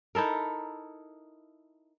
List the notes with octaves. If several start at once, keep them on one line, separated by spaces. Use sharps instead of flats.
D#4 E4 A4 A#4